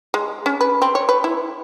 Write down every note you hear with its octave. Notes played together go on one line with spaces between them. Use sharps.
G#3
C#4
B4
C4
C#5
B4
E4